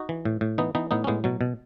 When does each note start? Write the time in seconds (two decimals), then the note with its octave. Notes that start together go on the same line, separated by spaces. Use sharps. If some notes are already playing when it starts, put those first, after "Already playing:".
Already playing: D#4 F#4
0.09 E3
0.25 A2
0.41 A2
0.58 E3 B3 D#4
0.75 E3 B3 D#4
0.91 A2 B3 D#4
1.04 C#4
1.07 A2 G#3 B3
1.24 B2 F#3
1.41 B2